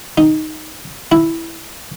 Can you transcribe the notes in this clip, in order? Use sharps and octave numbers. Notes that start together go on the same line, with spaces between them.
D#4
E4